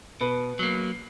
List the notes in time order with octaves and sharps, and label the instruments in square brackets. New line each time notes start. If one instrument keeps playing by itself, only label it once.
[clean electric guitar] B2 [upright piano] B4
[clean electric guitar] F#3 A#3